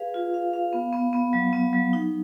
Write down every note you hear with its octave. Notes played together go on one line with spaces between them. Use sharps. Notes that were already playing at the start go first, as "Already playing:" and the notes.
Already playing: G#4 B4 F5
F4
F5
F5
B3
B3
B3
F#3
B3
F#3
D#4